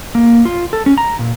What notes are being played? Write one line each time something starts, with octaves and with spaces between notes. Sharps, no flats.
A#3
F4
A4
C#4
A#5
A#2